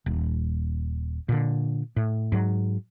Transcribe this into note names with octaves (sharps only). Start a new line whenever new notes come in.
D#1
A#2 D3
A2
G#2 F#3